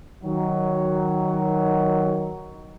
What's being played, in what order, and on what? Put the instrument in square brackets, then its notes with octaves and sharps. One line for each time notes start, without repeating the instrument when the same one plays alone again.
[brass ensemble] D#3 F#3